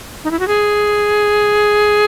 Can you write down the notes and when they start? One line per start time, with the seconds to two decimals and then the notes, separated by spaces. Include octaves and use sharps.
0.24 D#4
0.31 E4
0.39 F#4
0.48 G#4